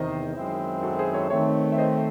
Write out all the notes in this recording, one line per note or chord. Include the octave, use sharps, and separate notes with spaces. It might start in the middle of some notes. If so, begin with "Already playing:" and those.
Already playing: E2 C3 D#3 C5 D#5
F#2 D#3 G#3 C4 E4
F#4 A4
G#4 C5
A4 C#5
D#3 A3 C4 C#5 E5
E5
C5 D#5